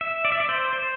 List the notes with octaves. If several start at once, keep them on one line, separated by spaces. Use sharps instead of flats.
E5
D5
E5
D5
C5
C5